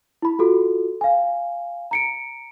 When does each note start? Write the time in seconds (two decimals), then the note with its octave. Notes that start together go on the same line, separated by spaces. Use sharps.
0.22 E4 B5
0.39 F4 F#4 A4
1.01 F5 G#5
1.91 A#5 C#7 D7